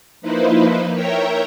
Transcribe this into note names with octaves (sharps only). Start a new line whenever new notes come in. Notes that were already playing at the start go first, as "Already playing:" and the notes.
F3 A#3 D#4 E4 B4 C5
A#4 C#5 E5 G5 A#5